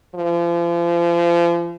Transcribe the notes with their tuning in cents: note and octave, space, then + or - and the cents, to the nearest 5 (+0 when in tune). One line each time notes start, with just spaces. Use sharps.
F3 -35